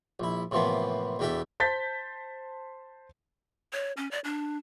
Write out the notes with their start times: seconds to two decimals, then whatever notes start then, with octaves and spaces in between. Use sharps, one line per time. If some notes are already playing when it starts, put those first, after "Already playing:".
0.20 A#1 E4
0.51 A2 C3 E3 F3 A#3 B3
1.19 E2 B2 D4 G4 A4 E5
1.60 C5 A5 G6 A6 B6
3.73 C#5
3.97 C#4
4.11 D5
4.24 D4